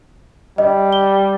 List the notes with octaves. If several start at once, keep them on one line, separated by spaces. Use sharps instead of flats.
G3 D#5
G7